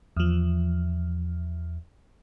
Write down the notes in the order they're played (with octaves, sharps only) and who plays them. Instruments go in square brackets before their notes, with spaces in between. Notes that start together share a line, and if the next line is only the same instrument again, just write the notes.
[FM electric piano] E2 F3